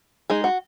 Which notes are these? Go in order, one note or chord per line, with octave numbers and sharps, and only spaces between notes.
G#3 D#4 G#4
F#4